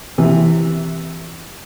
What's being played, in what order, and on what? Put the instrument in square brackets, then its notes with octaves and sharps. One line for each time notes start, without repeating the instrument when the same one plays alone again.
[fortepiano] C3 E3